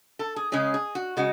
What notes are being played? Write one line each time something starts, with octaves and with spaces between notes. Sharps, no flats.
A4
G#4
C#3 G#3 C#4 G#4
G#4
F#4
C#3 G#3 F#4